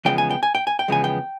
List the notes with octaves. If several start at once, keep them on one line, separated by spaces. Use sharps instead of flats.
E2 C#3 F3 G#3 B3 G5
G#5
G5
G#5
G5
G#5
G5
E2 C#3 F3 G#3 B3 G#5
G5